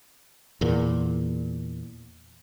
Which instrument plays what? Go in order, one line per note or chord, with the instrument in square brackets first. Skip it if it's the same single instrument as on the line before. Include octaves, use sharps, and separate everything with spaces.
[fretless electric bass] E2 A#2